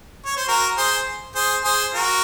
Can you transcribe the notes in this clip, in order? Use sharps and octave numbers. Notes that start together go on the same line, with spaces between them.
C#5
C5
F#4 A#4
G#4 C5
G#4 C5
G#4 C5
F#4 A#4